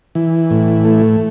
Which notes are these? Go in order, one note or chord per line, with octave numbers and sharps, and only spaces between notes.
E3
A2
A3